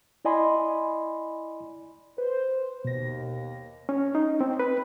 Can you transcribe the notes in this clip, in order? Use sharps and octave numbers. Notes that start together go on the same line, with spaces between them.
E4 D5 D#5 G#5 B5 C6
B4 C5
D#2 B2 A#6
C#4
D#4
C4
B4